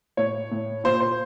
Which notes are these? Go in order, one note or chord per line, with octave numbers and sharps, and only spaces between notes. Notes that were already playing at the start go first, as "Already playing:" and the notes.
A2 C#5
A2
A#2 C5
C5